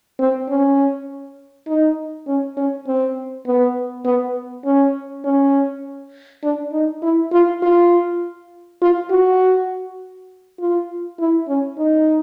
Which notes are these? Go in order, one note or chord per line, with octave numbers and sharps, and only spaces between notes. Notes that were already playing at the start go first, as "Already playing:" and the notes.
C4
C#4
D#4
C#4
C#4
C4
B3
B3
C#4
C#4
D4
D#4
E4
F4
F4
F4
F#4
F4
E4
C#4
D#4